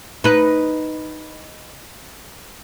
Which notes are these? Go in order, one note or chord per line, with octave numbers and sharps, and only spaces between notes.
D#4 B4